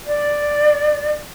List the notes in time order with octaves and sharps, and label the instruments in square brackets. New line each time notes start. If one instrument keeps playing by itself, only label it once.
[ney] D5